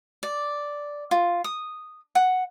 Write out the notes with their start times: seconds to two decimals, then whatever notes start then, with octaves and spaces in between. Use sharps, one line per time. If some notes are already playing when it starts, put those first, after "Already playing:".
0.23 D5
1.11 F4
1.44 D#6
2.15 F#5